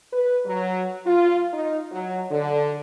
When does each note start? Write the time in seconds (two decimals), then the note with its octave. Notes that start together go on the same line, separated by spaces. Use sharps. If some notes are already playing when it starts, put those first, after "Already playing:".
0.13 B4
0.45 F#3
1.06 F4
1.53 D#4
1.91 F#3
2.30 D3